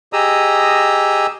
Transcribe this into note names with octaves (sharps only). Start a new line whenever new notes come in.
G4 G#4 D#5 A#5 D#6 E6